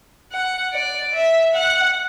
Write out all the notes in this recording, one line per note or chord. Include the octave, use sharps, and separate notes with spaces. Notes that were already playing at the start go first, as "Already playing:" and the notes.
F#5
D5
E5
F#5